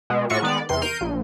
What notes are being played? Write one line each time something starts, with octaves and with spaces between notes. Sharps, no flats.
B2 G#3
A2 F4 F#4 C#6 C#7
D#3 G#3 B3 D5
E2 C3 C6
A#4 G6 C7 D#7
A#1